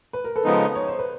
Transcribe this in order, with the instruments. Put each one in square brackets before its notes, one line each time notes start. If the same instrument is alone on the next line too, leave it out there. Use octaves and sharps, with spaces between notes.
[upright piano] B4
A#4
A4 B4
[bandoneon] C#3 F3 G#3 B3 D#4
[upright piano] C#5
C5
B4